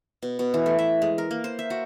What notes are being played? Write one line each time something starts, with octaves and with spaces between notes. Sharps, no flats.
B2
B2
E3
A3
E5
G#3
A#4
A#3
C5
E5
F#4